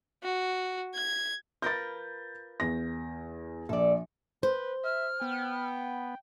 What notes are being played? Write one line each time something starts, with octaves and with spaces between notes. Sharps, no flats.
F#4
G#6
F4 A#4 B4 G6 A6
E2 A#6
A#1 A4 D5
B4 C5
E5 F6
B3 G5